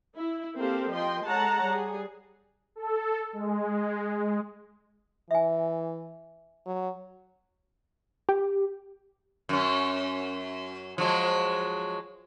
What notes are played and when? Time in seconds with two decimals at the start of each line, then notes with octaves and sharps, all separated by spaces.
0.15 E4
0.58 A#3 C4 G4 A4 C5 F5
0.91 F3 D#5 G5 C6
1.25 G#3 A4 C#5 F#5 A5 A#5
1.64 G3 G#4
2.76 A4
3.33 G#3
5.31 E3 E5 G#5
6.66 F#3
8.29 G4
9.49 F#2 C#4
10.98 F3 F#3 G#3